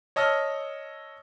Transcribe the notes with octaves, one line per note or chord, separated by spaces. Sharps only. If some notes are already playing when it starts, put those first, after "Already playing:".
C#5 D#5 A5 E6 F6